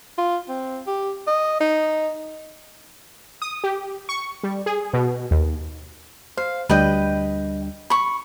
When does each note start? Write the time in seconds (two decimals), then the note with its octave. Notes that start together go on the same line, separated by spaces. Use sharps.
0.18 F4
0.48 C4
0.87 G4
1.27 D#5
1.60 D#4
3.42 D#6
3.64 G4
4.09 C#6
4.43 G3
4.66 G#4
4.93 B2
5.31 D#2
6.37 C5 F5
6.69 D2 G3 D4 B4 D#5 G5
7.90 B5 C#6